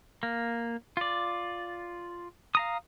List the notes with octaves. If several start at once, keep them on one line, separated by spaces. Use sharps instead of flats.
A#3
F4 D5
F5 A#5 D#6